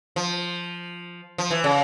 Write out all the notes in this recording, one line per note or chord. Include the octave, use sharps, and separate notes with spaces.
F3
F3
E3
C#3